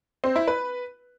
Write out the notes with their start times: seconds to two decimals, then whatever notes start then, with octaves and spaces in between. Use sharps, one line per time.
0.24 C4
0.36 E4
0.47 B4